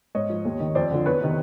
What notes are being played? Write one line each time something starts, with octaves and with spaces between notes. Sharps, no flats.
G#2 C#5 D#5
F3
D#2
D#3
F2 C5 D5
D3 F3
E2 B4 C#5
C3 D#3